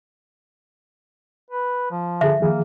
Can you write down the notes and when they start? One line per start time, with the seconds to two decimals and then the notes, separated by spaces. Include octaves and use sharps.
1.51 B4
1.91 F3
2.21 D3 G#4 A4 E5
2.40 D#3 F3 A#3 G#4